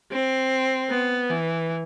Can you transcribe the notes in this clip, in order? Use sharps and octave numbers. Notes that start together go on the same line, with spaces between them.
C4
B3
E3